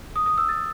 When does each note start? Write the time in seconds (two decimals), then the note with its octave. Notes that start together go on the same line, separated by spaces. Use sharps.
0.16 D#6
0.26 D#6
0.38 E6
0.49 A6